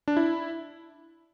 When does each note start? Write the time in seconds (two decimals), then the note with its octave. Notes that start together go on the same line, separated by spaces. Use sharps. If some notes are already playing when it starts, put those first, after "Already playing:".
0.08 D4
0.17 E4